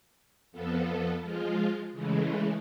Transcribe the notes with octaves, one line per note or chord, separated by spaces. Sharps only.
F2 F3 B3 A4
F3 G#3 F4
C#3 E3 G#3 A3